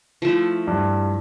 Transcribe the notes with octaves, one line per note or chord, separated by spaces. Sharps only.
F3 A3 E4
G2